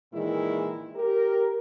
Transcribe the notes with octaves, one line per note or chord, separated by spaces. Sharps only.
A#2 D#3 E3 G#3 E4
G4 A#4